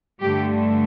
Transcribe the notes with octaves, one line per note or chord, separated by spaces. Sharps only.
G2 D3 A3 G4